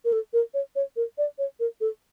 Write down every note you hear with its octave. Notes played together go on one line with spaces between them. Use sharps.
A#4
A4
A#4
C#5
C#5
A#4
D5
C#5
A#4
A4